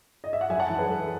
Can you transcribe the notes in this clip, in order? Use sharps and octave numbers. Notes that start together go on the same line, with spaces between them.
D#5
E5
F#5
F#2 E5 G#5
F#5 A5
E3
G#4 B4
F#2 A4